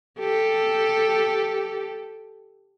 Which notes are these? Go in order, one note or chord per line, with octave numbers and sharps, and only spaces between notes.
G4 A4